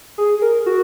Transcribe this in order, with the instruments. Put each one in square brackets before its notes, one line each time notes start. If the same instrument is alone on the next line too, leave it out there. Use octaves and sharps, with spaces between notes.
[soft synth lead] G#4
A#4
F#4